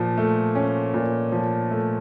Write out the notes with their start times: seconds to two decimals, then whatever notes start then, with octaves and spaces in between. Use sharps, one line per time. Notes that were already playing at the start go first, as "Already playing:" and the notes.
Already playing: A#2 F3
0.17 A3
0.55 C#4
0.94 A#2
1.32 F3
1.70 A3